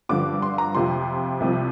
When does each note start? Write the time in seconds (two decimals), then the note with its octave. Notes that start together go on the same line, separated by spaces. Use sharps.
0.09 G2 D3 F3 D6
0.42 C6
0.58 A#5
0.75 F2 C3 F3 C6
1.40 C2 C3 F3